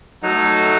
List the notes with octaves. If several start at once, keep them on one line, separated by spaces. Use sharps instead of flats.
F#3 A3 D#4 A4